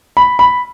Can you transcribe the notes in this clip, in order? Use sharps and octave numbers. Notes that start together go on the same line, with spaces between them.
B5
B5